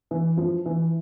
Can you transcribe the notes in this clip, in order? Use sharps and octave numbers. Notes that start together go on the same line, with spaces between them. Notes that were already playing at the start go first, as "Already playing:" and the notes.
E3
F3
E3